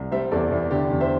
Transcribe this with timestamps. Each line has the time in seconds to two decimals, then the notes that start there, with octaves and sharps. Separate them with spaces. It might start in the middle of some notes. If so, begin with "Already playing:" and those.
Already playing: C2
0.12 G3 C5 E5
0.31 E2 A4 D5
0.51 E2 E4
0.71 D3 D4 G4
0.90 E2
1.01 C5 E5